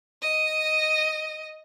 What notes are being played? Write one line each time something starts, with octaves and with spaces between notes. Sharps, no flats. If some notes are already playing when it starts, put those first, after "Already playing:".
D#5